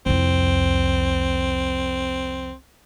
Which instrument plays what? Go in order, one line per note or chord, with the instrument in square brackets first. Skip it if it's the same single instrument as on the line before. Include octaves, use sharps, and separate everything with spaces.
[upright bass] C2 F2 [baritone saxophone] C4